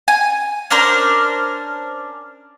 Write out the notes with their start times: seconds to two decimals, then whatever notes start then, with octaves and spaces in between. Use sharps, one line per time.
0.08 G#5
0.70 C#4 D4 A#4 C5